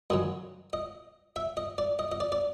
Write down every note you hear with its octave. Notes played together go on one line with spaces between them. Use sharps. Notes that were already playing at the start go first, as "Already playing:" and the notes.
F#2 D#3 F#3 D#5
D#5
E5
D#5
D5
D#5
D#5
D5
D5